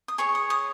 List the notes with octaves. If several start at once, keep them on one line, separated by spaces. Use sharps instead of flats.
D#6
G#4 C#5 C#6
D#6
D#6